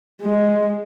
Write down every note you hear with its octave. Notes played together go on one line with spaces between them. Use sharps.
G#3